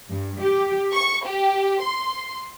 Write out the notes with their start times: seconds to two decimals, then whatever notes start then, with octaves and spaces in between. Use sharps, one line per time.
0.11 G2
0.42 G4
0.95 C#6
1.27 G4
1.82 C6